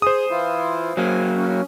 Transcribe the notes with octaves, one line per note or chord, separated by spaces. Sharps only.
G#4 C5 D#6
E3 E4 F4
F#3 A#3 G#5
C#4